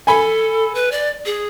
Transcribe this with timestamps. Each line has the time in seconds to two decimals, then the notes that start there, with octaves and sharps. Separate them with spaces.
0.07 A4 G#5 B5
0.75 B4
0.92 D5
1.25 G#4